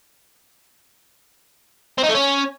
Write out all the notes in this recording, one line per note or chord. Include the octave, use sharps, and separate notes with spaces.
C4
D#4
A3
C#4